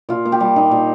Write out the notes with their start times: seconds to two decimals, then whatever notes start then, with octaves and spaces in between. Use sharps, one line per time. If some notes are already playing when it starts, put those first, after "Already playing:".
0.09 A#2 F4
0.25 A#2
0.32 G4
0.40 G3
0.56 A#2 D#4
0.71 A#2